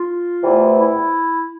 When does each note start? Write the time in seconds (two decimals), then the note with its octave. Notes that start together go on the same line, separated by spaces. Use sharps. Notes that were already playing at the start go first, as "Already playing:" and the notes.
Already playing: F4
0.44 E2 C3 E3 A3
0.78 E4